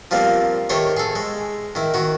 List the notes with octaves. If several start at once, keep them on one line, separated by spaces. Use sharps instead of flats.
F3 G3 A#3 C4
D#3 A3 G4 C5 C#5
G#4 A4
G#3
D#3 E4
D#3 F#4